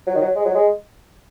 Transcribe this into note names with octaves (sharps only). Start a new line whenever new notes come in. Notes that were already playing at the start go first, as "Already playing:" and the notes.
F#3
D#3
F#3
G#3
F#3
G#3